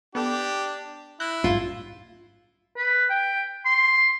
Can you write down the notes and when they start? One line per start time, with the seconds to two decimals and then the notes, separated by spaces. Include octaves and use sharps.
0.15 B3 D4 G4 A4
1.20 E4 F#6 G6 A#6
1.44 A#1 G#2 F4
2.76 B4
3.10 G5
3.66 C6